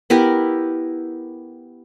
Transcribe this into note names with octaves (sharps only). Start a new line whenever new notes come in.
B3 E4 G4 A#4